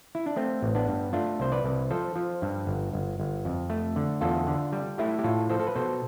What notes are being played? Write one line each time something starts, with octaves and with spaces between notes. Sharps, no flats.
E4
D4
A3 C4
A1
B3 D4
G2
A3 D4 F4
C2 C5
B4 D5
C2
F3 A4 C5
F3
G2
G1
G1
G1
F2
A3
D3
E2 F4 A4
D3
G3
A3 E4 G4
G4
A2 F4 A4
F3 A4 C5
A4
B4
B2 A4 C5